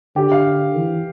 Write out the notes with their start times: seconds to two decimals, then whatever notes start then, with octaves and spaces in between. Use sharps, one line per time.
0.16 D3 G4
0.32 F5
0.76 E3